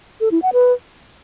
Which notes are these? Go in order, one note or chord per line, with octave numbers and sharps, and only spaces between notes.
A4
E4
F#5
B4